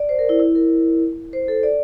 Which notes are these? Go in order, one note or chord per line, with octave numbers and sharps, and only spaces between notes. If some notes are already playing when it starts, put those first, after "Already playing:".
Already playing: D5
C5
A#4
E4
E4
A#4
C5
A4
D5